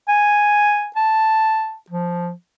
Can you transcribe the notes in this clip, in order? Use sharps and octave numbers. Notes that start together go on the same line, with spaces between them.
G#5
A5
F3